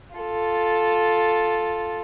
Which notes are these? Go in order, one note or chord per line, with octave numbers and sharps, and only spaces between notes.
F4 A4